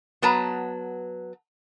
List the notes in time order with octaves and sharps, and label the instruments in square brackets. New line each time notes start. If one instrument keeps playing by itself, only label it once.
[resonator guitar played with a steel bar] F#3 B3 B4 A5 A#5